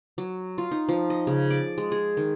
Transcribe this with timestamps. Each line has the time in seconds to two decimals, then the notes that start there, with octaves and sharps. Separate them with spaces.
0.18 F#3
0.58 F4
0.71 D#4
0.89 F3
1.10 D#5
1.27 C#3
1.50 D5
1.78 G#3
1.92 G#4
2.17 D#3